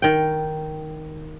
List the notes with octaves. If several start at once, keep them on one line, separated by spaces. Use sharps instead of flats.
D#3 G5